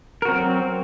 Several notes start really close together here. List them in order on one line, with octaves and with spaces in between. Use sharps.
A#4 F#4 C4 F#3